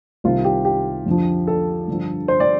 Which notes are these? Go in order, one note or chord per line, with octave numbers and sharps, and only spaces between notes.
C2 C3 D#3 F4
G4
G4
F2 D3 F3
A4
G2 D3 F3
C5
D5